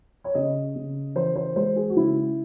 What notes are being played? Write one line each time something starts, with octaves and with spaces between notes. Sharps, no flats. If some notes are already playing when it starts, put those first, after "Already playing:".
C#5
C#3 D#5
C#3
E3 C5
C5
G#3 C5
G#4
F#4
C#3 E4